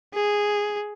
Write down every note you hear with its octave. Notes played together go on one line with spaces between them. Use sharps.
G#4